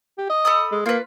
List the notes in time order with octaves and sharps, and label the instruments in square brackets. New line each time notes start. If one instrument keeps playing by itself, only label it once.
[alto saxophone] G4
D#5
[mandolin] A4 B5 D#6
[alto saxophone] G#3
[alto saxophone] A#3 [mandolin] F4 B4